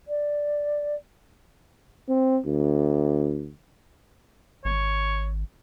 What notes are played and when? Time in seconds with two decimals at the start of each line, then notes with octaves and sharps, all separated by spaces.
0.07 D5
2.09 C4
2.46 D2
4.65 G#1 C#5